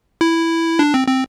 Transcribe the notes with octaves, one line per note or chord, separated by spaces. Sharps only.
E4
D4
C4
C4